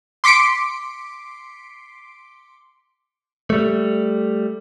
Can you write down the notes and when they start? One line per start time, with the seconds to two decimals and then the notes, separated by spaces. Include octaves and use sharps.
0.24 C6 D6 B6 C#7 D7
3.50 G3 A3